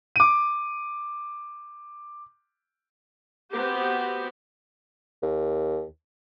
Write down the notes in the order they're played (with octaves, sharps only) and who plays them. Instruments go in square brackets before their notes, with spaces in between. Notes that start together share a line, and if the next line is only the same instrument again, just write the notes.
[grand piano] D6 D#7
[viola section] B3 C4 F#4 G4
[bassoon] D#2